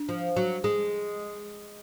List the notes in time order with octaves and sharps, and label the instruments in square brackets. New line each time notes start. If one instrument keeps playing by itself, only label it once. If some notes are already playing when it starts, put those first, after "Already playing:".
Already playing: [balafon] D4
[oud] F3
F#3
G#3